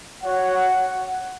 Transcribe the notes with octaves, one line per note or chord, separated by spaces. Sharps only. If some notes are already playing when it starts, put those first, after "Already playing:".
F#4 C#5 F#5